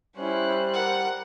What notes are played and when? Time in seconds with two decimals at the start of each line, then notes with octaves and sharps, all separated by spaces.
0.17 G3 C#4 E4 C5 F#6
0.74 A#4 F#5